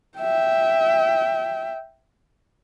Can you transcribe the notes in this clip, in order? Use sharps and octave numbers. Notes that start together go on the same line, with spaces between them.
E5 G5